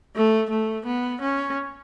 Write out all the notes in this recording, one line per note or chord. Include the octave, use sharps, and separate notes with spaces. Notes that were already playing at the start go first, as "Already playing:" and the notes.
A3
A3
B3
C#4